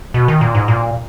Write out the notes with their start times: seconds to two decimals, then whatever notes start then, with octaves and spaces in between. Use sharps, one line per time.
0.14 B2
0.28 D#3
0.41 A#2
0.55 G#2
0.68 A#2